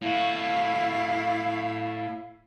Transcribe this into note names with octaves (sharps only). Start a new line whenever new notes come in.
A2 E4 F#4 F5